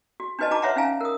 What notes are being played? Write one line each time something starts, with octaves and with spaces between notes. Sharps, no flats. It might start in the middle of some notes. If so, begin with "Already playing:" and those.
F#4
D4 D#4 F#4 B4 D#5 A5
D#4 F#4 B4 A5 A#5 D6
B4 C#5 E5 F#5 A#5
C#4 D#4 F5 G#5 A#5
A#4 D#6